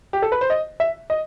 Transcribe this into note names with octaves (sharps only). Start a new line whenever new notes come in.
G4
A4
B4
C5
D#5
E5
D#5